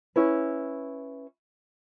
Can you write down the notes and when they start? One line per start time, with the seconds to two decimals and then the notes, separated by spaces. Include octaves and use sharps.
0.16 C#4 E4 B4